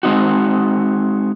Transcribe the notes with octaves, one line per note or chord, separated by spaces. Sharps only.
G#3 C4 D#4 F#4